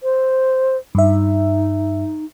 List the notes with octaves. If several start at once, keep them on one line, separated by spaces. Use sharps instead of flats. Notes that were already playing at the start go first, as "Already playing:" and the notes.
C5
G2 D#4 E5